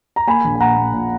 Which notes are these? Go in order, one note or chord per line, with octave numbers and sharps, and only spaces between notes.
A#5
A#3 G#5 B5
A#1
G#5
A#2 F#5 A#5
A#3
A#2